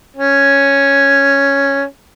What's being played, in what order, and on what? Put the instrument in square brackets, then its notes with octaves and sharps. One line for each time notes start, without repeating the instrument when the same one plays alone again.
[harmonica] C#4